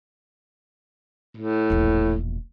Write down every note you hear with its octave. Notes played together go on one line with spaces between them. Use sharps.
A2
E1 A#1